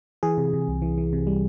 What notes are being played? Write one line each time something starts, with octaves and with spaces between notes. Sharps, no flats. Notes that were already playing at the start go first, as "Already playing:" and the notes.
E3 G#4
C3
C3
C2
E3
E3
C3
G3